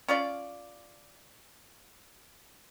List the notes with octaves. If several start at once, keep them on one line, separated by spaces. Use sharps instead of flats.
C#4 F4 D5